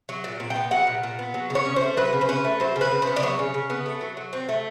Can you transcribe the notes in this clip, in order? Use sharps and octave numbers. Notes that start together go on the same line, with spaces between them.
F#3
A#2
A#2
G5
B3
F#3 F#5
A#2
A#2
B3
F#3
C#3
C#5
C#4
A3 C5
F#3 B4
C#3
C5
C#4 B4
A3
F#3 C5
C#3
B4
C#3
C5
B3
D5
F#3 C#5
C#3
C#3
B3
A3
F#3
F#3
C4
A3